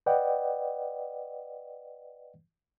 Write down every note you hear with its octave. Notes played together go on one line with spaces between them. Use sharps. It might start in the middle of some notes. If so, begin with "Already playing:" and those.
B4 D5 D#5 F#5 G5